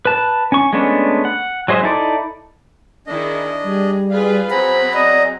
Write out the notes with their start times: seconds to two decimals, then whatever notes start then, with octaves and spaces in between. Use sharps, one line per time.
0.05 B4 A5
0.52 C#4 C#6
0.73 G#3 A3 B3 C#4 D4
1.25 F#5
1.68 F#3 G#3 C5 D#5 E5
1.83 D#4 E4 A4 D5
3.07 D#3 D4 E4 G#4 D#5
3.64 G3 G#4
4.10 F4 G#4 B4 F5
4.50 F#3 C4 G#4 C5 F#5 A#5 B5
4.94 D5 D#5